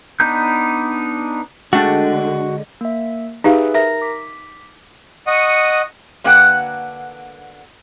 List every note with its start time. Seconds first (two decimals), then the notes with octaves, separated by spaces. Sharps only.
0.20 B3 D4 D#4 G6
1.73 D3 G#3 A3 D4 F#4 G5
2.81 A#3 E5
3.44 D#4 G4 G#4 B4 E5 F5
3.74 A#4 E5 A#5 A#6
4.02 D6 B6
5.27 D#5 F#5 C#6 D#6
6.24 D3 A#3 F#4 B4 F#5 G5